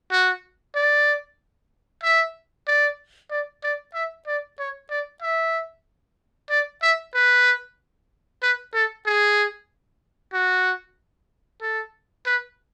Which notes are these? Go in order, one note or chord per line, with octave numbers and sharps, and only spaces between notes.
F#4
D5
E5
D5
D5
D5
E5
D5
C#5
D5
E5
D5
E5
B4
B4
A4
G#4
F#4
A4
B4